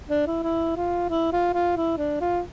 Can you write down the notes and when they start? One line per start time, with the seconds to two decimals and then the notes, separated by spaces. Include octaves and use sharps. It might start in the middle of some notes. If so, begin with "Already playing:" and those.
0.09 D4
0.27 E4
0.43 E4
0.77 F4
1.10 E4
1.33 F4
1.54 F4
1.77 E4
1.98 D4
2.21 F4